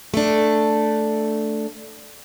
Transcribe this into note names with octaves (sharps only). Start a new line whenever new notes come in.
A3 D4